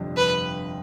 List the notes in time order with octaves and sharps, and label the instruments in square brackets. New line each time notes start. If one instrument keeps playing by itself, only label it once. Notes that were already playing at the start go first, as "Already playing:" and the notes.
Already playing: [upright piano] G1 F2 C3 G3 D4
[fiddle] B4